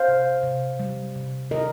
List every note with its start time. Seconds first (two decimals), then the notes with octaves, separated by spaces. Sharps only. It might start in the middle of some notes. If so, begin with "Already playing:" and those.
Already playing: C5 F5
0.08 C3
0.43 C3
0.79 G3
1.15 C3
1.50 D#3 A#4 D#5